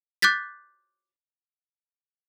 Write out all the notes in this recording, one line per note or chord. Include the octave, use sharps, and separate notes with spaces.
D6 F#6 G6 A6 B6